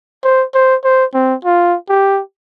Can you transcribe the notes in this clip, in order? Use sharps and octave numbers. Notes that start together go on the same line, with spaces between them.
C5
C5
C5
C4
F4
G4